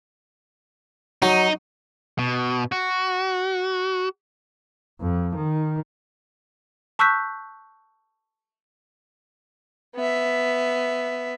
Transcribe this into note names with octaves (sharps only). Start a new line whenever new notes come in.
F#3 D#4
B2
F#4
F2
D#3
A5 C#6 E6 F#6 G6 B6
B3 E5